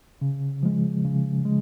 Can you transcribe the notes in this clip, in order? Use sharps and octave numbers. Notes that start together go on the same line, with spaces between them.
C#3
F3 G#3
C#3
G#3